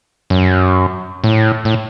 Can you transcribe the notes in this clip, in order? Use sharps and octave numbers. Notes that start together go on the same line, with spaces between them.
F#2
A2
A2